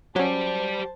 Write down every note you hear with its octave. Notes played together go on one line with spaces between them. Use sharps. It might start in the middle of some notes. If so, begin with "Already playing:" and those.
F#3 C#4 G4 C5 D5 A5